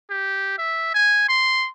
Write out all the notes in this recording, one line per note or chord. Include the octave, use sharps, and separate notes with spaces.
G4
E5
G#5
C6